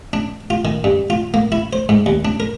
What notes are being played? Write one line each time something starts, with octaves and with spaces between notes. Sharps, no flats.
D4
F4
D#3
G2
F4
A#3
E4
C5
G#2
D#2
D4
A#4